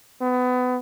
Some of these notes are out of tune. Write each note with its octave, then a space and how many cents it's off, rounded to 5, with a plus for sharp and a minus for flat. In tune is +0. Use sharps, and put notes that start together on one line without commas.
B3 +25